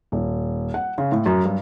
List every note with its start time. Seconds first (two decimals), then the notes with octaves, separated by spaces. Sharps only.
0.12 D#1
0.74 F#5
0.98 C#3
1.12 A2
1.26 F#2
1.45 G2